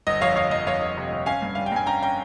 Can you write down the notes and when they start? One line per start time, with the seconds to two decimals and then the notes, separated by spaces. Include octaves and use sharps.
0.07 G1 D#5
0.21 F2 C#5 F5
0.36 G1 C#5 F5
0.51 F2 D#5
0.67 F2 C#5 F5
0.81 G1
0.97 C3
1.12 G1
1.26 C#4 F5 G#5
1.42 G2
1.55 G3 F5
1.66 G5
1.72 G2 G#5
1.86 C#4 G5 A#5
2.02 C#4 G5 A#5